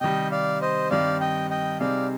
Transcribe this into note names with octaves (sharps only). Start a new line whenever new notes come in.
C3 D#3 G3 D#5 G5
D5 F5
C5 D#5
G2 D#3 G3 C4 D5 F5
D#5 G5
D#5 G5
C3 G3 C4 D#4 G#4 D5 F5